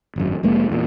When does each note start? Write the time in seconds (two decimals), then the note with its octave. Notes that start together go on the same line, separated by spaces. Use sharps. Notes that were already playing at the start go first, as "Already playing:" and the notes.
0.16 G#1 F#2
0.43 F1 G#3 A#3
0.69 E2 A#2